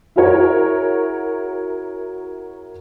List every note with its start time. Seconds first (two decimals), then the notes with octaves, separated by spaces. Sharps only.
0.16 E4 F#4 G#4 A#4 C#5